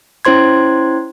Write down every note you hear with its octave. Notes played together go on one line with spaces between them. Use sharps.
C#4 E4 C5 C6 G#6